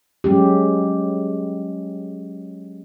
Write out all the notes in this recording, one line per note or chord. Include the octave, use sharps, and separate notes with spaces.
F#3 G#3 C#4 G4